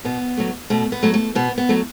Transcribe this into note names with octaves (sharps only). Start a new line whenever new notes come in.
B2 B3
F#3 A3
B2 A3
B3
F#3 A3
A3
B2 B3
B3
F#3 A3